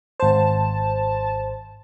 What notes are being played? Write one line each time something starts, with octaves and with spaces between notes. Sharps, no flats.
G#1 C5 A5